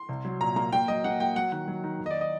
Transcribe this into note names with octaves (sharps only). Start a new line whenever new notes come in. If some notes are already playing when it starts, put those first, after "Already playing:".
Already playing: C6
C2
F#3
A#2 A#5
A#3 A#5
A#3 G5
F#3 D#5
A#3 F#5
A#3 G5
F#3 F#5
D#3 F#5
F#3
D#3
D#2
D#5
D5
D#5